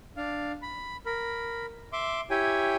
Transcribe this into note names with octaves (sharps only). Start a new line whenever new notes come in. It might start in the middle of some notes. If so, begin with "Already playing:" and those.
D4 F5
B5
A#4 B5
E5 C6 D6
E4 G4 C#5 G5 G#5